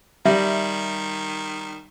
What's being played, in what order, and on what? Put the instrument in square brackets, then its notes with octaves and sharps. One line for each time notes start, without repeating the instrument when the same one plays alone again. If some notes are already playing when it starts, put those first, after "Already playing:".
[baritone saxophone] D#3 [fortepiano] G3 [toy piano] E5